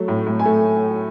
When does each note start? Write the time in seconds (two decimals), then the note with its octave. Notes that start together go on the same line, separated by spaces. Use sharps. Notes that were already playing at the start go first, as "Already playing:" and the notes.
Already playing: F#3 A3
0.08 A2
0.26 A2
0.39 G#5
0.45 A3